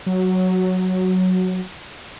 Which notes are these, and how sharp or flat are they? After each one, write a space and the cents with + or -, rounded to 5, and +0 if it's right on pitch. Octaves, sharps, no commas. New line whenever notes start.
F#3 +0